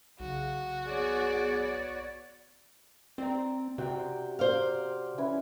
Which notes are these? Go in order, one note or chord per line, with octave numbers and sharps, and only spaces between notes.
B1 C#3 F#4
B3 G#4 C#5 D5
C4 D5 A#5
C3 F#4 G5
C5 D5 F5
E3 C#4 E4